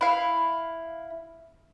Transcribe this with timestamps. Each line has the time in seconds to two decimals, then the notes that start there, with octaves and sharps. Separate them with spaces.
0.01 E4 F5